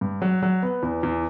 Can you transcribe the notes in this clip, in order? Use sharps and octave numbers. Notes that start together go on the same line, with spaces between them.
G2
F#3
F#3
B3
E2
E2